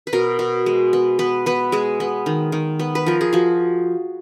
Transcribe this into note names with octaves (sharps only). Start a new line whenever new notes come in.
B4
B2 A#4
B2
G#3
B3
B3 B4
B3 B4
G#3 G#4
B3
D#3
D#3
B3
B4
F3 A#4
G#4
F3 F#4